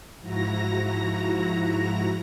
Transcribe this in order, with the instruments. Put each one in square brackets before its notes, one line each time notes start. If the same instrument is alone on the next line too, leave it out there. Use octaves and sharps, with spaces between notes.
[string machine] G#2 F3 E4 F#4 A#5 A#6